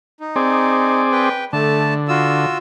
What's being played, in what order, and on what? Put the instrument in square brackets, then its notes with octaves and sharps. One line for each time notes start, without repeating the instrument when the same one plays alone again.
[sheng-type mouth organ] D#4
[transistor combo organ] C4 G#4 D5
[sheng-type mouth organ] B4 G5
[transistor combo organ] D3 [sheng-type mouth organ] A3 A5
[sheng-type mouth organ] F4 F#4 E6